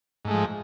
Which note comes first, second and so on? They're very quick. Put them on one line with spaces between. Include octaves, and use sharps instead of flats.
G#2 A3 G#3 F3